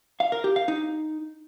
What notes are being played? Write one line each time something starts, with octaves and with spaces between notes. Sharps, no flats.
F5
A#4
G4
F5
D#4